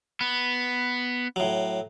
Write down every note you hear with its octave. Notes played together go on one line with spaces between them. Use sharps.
B3
A2 F#3